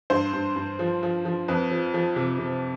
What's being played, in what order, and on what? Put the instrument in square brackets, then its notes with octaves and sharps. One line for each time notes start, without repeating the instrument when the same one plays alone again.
[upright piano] G2 C5
G2
G2
F3
F3
F3
F2 B4
F3
F3
C3
C3